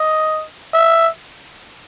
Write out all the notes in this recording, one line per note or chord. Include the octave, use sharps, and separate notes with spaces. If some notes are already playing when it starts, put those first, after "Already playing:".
Already playing: D#5
E5